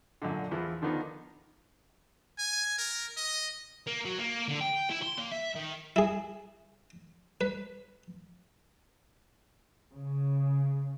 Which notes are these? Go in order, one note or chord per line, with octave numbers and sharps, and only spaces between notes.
F#2 A#2 D3
E2 F3 E4
D3 D#3 F3 B3 D#4
G#5
A#4
D#5
A#3
F#3
A#3
D3
G5
E4
C6
A#3
E5
D#3
E4 G#4
B4
C#3